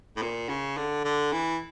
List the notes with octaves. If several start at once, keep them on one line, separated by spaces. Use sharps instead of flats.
A2
A#2
C#3
D3
D3
E3